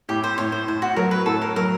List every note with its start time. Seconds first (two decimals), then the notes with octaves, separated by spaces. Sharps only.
0.09 A2 G4
0.24 C5
0.38 A2 C#5
0.52 C5
0.68 A2 C5
0.82 F#4
0.96 F#3 A#4
1.11 B4
1.26 A2 A4
1.42 A#4
1.56 F#3 A#4